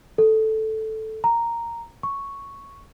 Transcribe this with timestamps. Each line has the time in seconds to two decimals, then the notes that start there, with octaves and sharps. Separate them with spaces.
0.18 A4
1.24 A#5
2.03 C#6